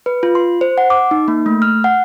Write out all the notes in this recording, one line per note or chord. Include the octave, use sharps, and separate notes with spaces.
B4
F4
C6
C5
F#5
D6
D#4
A#3
A3
F6
F#5